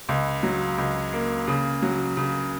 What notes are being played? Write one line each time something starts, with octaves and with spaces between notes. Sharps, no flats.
C#2
F#3
C#2
A#3
C#3
F#3
C#3